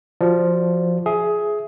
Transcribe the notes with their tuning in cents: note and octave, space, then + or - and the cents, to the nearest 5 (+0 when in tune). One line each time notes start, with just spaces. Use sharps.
F3 +0 F#4 +10 D5 +0
G#4 +15 E5 +0